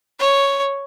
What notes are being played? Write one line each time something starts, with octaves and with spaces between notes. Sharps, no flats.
C#5